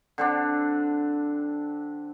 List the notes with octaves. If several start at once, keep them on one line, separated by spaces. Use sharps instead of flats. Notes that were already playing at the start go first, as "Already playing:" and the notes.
D3 C4 D4